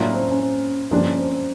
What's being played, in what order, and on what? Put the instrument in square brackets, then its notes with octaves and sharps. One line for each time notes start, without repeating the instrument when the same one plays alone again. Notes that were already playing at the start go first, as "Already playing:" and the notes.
Already playing: [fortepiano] A2 F#3 A#3 D4 F4
[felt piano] C#4
C4
C#4
C4
[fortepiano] G2 D3 F3 A#3 D4 [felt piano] C#4
[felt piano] C#4
C4
C4